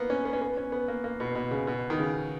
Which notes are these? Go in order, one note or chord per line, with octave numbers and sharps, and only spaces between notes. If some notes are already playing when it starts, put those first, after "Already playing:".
Already playing: A#3 B3
C#4
B3
C#4
B3
C#4
B3
A#3
A#3
B2
B2
C#3
B2
D#3
C#3